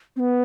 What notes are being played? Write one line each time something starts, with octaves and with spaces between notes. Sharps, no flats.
C4
B3